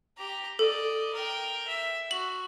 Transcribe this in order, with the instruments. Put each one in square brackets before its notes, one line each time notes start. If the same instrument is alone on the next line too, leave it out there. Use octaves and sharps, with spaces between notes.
[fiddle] G4 A#5
[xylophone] A4 [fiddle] D5 D#5
[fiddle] A#4 G5
E5
[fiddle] F#4 [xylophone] F#7